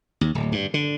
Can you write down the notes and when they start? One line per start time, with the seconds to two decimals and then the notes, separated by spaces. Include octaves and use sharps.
0.21 D#2
0.35 D1
0.52 G2
0.74 D3